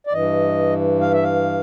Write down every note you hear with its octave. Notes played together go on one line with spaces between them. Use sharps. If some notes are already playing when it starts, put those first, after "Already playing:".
D5
G2 E3 D#5
F5
E5
F5